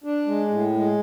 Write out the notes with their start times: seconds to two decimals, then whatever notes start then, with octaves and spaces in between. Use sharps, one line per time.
0.04 D4
0.26 G#3
0.50 A2
0.74 G#3